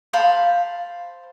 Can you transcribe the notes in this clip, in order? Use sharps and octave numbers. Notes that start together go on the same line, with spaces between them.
C5 F5 A5 B5